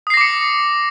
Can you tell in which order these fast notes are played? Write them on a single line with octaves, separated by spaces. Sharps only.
D#6 C7 A#6 D6 C#7